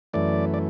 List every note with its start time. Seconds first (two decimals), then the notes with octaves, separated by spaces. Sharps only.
0.13 F#2 E3 A3 D5
0.54 D5